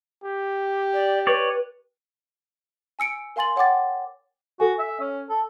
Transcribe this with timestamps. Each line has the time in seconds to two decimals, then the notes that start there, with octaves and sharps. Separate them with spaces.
0.24 G4
0.93 D5
1.27 B4 C#5 D5
2.99 G#5 E6 C#7 D7
3.36 A#4 F5 G#5 C6 A6 F#7
3.56 C#5 F#5 G5 D6 A6
4.60 F#4 A4 G#5
4.79 E5
5.00 C#4
5.29 A4